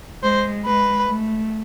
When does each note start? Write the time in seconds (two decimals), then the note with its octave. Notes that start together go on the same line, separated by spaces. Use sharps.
0.23 G#3 C5
0.65 G#3 B4
1.06 A3